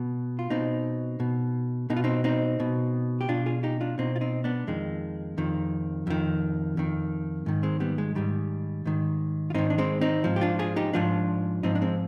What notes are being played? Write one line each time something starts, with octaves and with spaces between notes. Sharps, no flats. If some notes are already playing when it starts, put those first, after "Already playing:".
Already playing: B2
F4
B2 C4 D#4
B2
B2 D#4
F4
C4 D#4
C4 D#4
B2
G4
B2 D4 F4
F4 G#4
D#4 G4
D4 F4
B2 C4 D#4
F4
C4 D#4
B3 D4
F2 D#3 G#3
F2 D#3
F2 D#3
F2 D#3
G#2 D#3
G#3 C4
G3 B3
G#3
G#2 D#3 G3
G#2 D#3
F4
G#2 D#3 C4 D#4
D4
G#3 C4
C4 D#4
G#2 F3
G4
D4 F4
F4 G#4
D#4 G4
G#2 F3 D4 F4
G#2 F3 C4 D#4
D4
G#3 C4